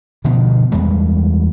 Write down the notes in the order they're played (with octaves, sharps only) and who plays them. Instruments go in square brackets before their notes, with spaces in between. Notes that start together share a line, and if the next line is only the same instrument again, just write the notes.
[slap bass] B2 D3 D#3 F3
E2 G3 G#3